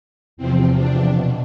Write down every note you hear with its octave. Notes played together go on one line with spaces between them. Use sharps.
E2 C3 F3 C4
D4
B2